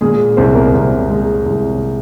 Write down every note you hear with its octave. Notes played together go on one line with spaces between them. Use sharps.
A#2 G#3 G#4
C2 C4 C5
A#3 A#4
C2 C4
G#3
C2